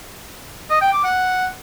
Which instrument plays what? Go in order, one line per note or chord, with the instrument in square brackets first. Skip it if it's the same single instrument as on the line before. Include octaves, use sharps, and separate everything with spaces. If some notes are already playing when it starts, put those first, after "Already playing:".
[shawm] D#5
G5
D6
F#5